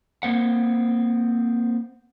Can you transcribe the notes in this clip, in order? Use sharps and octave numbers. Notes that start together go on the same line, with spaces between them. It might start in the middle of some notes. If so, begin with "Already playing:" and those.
A#3 C4 F#5